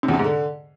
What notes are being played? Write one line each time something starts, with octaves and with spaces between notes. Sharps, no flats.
C3
E2
C3
G#2
D3